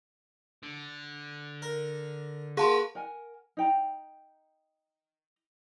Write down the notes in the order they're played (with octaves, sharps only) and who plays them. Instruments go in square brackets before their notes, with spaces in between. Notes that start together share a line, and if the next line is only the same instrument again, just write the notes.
[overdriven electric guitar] D3
[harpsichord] A#4
[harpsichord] A#3 F#4 [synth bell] G#4 A5 C6 [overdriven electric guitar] B4
[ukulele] A#4 F#5 G#5
D#4 G5 A#5